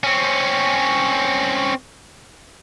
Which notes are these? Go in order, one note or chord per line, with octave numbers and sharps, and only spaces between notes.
C4 C#4